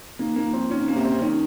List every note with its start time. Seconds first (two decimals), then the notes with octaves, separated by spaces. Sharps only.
0.19 D#3 A#3
0.36 D#3 A#3
0.53 F3 C4
0.71 D#3 C#4
0.88 A#3
0.96 C3
1.05 C4
1.22 D#3 C#4